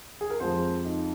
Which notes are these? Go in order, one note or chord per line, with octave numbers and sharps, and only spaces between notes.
G#4
A#4
F2 F3 G#3 C5
D#4